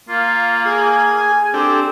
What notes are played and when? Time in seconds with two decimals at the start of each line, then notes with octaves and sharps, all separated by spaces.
0.09 A#3 F4
0.66 G#4 G#5
1.54 C4 D4 G4 A4